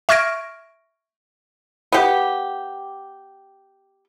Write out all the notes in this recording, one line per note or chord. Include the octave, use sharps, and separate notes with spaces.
E5 C#6 F6 G#6 A#6 D7
B3 G4